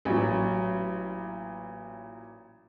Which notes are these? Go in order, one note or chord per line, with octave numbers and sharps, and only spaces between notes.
A1 A#2 F#3